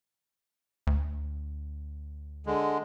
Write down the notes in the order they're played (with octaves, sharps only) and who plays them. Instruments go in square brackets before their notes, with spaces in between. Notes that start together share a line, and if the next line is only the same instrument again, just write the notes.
[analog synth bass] D2
[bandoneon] D3 G#3